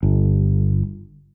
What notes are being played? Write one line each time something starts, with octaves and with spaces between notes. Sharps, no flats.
G1